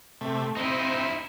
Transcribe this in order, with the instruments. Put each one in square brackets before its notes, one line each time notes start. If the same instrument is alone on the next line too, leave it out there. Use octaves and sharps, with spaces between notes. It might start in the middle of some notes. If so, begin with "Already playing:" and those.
[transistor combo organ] C3 A3
[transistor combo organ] C4 [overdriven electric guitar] D#4 E4